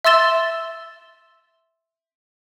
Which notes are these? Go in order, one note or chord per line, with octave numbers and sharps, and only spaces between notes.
E5 C6 E6 A6 E7 G7